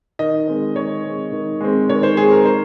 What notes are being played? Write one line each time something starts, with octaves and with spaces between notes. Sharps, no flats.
D#3 D#5
G#3 C4
D#3 C#5
G#3 C4
D#3
G#3 C4
D#3 C#5
C5
G#3 C4 G#4
A#4
D#3 C5